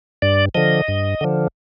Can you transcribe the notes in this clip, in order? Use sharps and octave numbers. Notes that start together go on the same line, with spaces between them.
G2 D5
D3 F3 D#5
G2
D3 F3